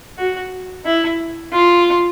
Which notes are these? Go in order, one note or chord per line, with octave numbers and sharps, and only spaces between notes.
F#4
E4
F4